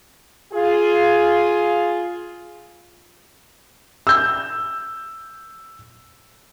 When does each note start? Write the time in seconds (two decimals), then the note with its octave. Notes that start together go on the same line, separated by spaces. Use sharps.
0.52 F4 G#4
4.07 E6 G6